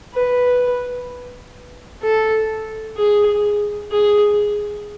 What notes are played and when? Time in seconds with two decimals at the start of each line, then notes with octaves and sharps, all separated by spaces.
0.14 B4
2.02 A4
2.97 G#4
3.91 G#4